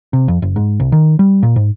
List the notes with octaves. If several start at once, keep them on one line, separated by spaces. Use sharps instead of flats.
C3
F2
F#1
G#2
C2
D#3
G3
A#2
G#2